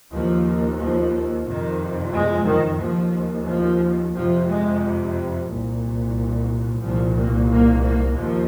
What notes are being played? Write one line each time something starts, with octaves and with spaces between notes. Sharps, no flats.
D#2 F3
F3
F2 C3 D#3
G#3
D#3
D#2 F3
F3
F2 C3 F3
G#3
C2 A#2
C2 A#2 F3
A#3
A#3
A#3
D#2 F3